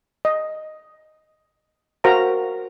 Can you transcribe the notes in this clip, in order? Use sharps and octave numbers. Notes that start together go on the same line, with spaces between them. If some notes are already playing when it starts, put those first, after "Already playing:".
D#5
F#4 A#4 C5 F5 A#5